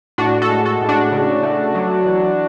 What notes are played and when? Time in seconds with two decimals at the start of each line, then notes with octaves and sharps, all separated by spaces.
0.18 A2 D4 F#4
0.42 F#4 A4
0.49 G#3
0.65 F#4 A4
0.81 A2
0.89 D4 F#4
1.12 C#3
1.43 A3
1.75 F#3
2.06 E3